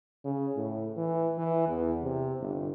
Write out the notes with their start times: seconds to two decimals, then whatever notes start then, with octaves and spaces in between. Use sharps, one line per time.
0.24 C#3
0.56 A2
0.97 E3
1.38 E3
1.68 E2
2.03 C3
2.40 G1